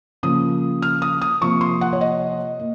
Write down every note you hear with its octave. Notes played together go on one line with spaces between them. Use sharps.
C#3 F3 A#3 D#6
F6
D#6
D#6
C3 F3 A#3 C#6
C6
F#5
C#5
D#5
A#3